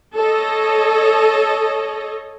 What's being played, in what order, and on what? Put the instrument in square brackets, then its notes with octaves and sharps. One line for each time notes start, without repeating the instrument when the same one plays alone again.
[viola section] A4 C#5 D#5